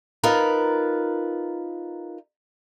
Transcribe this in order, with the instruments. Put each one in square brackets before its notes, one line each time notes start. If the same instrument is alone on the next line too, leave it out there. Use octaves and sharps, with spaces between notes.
[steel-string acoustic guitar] D#4 F4 A#4 B4